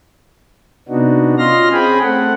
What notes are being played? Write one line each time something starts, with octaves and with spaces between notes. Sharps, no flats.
C3 B3 D4 D#4 F#4
C#4 F4 D#5 C6 F6 A#6
C4 C#4 G#4 G5 G#5 B5
A3 C4 A4 F#5